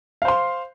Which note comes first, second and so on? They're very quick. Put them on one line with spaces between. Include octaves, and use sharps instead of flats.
F5 C5 C6